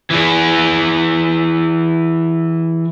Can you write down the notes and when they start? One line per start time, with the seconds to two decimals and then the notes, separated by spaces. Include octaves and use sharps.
0.10 E3 G#4